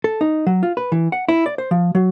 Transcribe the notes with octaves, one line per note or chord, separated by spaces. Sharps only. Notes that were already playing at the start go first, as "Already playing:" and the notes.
A4
D#4
F#3
F4
B4
E3
F#5
E4
D5
C5
F3
F#3